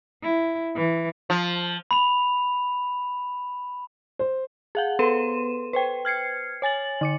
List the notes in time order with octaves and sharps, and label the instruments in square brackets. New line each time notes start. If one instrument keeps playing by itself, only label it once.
[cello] E4
E3
[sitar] F3
[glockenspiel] B5 F7
[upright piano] C5
[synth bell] G#4 F5 F#5
B3 A4 B4 C6 D#7 E7
B4 C5 G5
F6 G#6 C7 C#7
C#5 G#5 A6 F#7
D3 D6 C#7